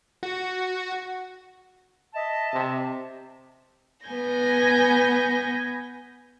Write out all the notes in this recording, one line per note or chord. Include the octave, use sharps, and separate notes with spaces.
F#4
D#5 E5 A5
C3
B3 B4 G#5 G6 A#6